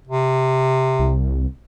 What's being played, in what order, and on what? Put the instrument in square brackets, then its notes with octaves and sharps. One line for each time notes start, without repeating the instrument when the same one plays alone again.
[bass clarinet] C3
[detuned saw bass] C2